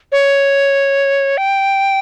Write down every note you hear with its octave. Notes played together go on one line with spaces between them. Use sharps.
C#5
G5